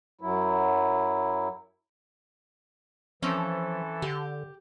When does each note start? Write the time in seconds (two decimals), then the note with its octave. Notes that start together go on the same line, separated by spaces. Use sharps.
0.21 F#2 F#3 E4
3.22 E3 F3 C4 C#4 A4
4.02 D3 G4